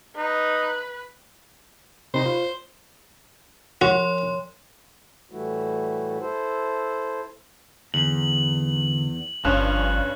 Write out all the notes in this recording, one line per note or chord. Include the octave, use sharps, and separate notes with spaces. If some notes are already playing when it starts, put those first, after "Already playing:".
D#4 B4
C3 C4 D#4 C5
F4
F3 F#4 C#5 C6
A2 E3 G3 A3 E4 F#4
E4 A4 C5
E2 D3 F#7
G1 G2 F3 C#4 F#6